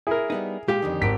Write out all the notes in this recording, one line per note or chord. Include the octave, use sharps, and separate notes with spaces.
E4 G#4 A#4
G3 B3 D#4
A#2 G#3 G4 F5
F2 D3 D#3
G#1 B6 D7